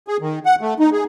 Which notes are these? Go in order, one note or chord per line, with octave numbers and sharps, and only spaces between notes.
G#4
D#3
F#5
A3
D#4
G#4